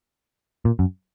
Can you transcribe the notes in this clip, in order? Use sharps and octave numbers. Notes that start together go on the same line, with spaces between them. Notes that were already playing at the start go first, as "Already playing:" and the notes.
A#2
F#2